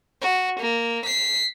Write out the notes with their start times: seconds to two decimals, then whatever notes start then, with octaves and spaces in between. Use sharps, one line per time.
0.22 F#4
0.60 A#3
1.06 B6 C7